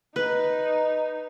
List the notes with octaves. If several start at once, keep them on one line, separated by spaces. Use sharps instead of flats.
D#4 B4